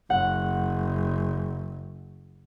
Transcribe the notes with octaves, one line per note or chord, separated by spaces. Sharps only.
F#1 F#5